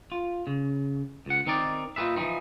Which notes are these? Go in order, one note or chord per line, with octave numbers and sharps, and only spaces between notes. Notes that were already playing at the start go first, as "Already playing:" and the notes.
F4
C#3
C#2 F#5
D#3 C4 D#4 A#4 D5
A#2 D#4 F4 G#4 B4 E5
E3 F3 G3 C4 D#4